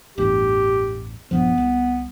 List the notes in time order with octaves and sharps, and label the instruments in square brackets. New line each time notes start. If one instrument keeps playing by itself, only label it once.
[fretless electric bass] A1 E2 G2 [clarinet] G4
[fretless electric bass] A#1 G2 F3 [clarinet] B3
[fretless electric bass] C2